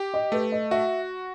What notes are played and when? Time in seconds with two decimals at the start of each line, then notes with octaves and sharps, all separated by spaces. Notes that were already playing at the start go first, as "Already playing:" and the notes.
Already playing: G4
0.14 D#5
0.32 A3 B4
0.52 D#5
0.71 F#4 E5